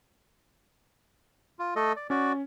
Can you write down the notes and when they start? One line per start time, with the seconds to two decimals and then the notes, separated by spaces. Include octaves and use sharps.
1.59 F4
1.76 A3 A4 D#5
1.96 D5
2.10 C#4 F#4 D5